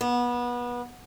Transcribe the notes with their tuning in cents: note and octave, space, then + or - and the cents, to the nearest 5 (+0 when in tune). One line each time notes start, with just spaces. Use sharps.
B3 -25